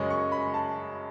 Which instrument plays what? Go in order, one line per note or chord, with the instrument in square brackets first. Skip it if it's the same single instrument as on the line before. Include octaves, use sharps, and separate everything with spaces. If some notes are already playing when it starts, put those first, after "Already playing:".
Already playing: [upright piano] F#2 C#3 G#3 C#4 D#5
C#6
B5
A5